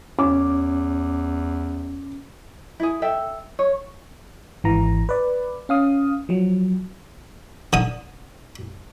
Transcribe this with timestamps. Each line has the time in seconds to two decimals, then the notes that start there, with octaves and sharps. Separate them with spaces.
0.19 E2 C#4 D6
2.80 E4 G#4
3.02 A4 E5 G5
3.59 C#5
4.64 G#1 E3 A#5
5.09 B4 D5
5.69 C#4 F5 D#6
6.29 F3 F#3
7.73 D3 D#6